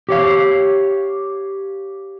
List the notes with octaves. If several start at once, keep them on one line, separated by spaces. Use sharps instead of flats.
G4 C#5 F5